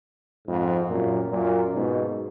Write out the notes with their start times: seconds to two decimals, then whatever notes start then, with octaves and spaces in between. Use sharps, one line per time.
0.47 F2 G#2
0.89 F#2 A#2
1.31 F#2 A#2
1.73 G#2 B2